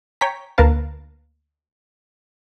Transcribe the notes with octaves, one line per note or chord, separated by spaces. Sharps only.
C#5 G5 G#5 A#5 B6
D2 A#3 A#4 B4 F5 A5